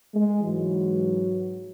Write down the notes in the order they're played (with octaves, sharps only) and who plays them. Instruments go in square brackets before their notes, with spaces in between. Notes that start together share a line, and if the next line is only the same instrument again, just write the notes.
[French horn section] G#3
G#2 E3 F#3